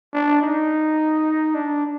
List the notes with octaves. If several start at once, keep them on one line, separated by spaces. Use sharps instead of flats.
D4
D#4
D4